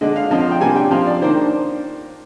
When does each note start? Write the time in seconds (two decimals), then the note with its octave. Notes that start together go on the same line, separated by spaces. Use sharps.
0.01 D3 G#3 D4 D#5
0.16 F5
0.30 D3 F3 C4 D#5
0.40 F5
0.51 G5
0.61 C3 G3 A#3 D4 G#5
0.76 G5
0.91 F3 C4 F5
1.07 D5
1.22 D#3 A#3 D4 C5